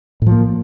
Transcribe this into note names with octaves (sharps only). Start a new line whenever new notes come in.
A2 F3 A#3